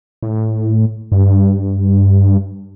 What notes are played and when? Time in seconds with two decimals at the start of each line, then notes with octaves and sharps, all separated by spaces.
0.23 A2
1.12 G2